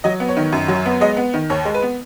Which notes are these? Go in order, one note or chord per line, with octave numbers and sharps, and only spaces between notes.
F#3 D#5
B3
C#5
D#3
F#2
F#3
B3
G#3 D#5
B3
D#3
D#2 C#5
G#3
B4
B3